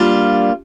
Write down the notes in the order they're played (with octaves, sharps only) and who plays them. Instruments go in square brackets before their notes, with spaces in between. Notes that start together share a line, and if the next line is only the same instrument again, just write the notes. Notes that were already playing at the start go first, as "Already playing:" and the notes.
Already playing: [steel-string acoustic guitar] G3 A#3 D4 F4